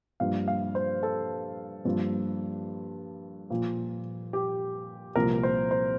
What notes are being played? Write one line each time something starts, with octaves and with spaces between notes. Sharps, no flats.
G2 F3 A#3 F5
F5
C5
A4
G2 F3 A#3
A#2 F3 A#3
G4
C2 A#2 F3 A#3 A#4
C5
C5